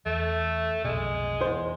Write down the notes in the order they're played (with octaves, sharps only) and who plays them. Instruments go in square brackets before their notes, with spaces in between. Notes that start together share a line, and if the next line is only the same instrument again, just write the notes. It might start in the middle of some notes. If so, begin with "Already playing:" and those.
[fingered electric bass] E2 [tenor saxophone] A3
[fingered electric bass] F1 B1 B2 [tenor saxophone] G#3
[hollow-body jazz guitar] E2 C5